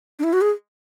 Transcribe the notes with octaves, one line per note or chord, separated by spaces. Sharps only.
D4
E4
F#4
G#4